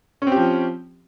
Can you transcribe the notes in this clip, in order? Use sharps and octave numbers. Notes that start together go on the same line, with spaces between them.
F3 C4 C#4 G4